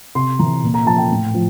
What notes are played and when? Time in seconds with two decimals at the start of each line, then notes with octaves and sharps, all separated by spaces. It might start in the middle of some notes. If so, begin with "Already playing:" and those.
0.15 C3 C6
0.39 E3 A#5
0.63 A#2
0.74 A#5
0.86 F3 A5
0.98 G5
1.11 A2
1.34 F3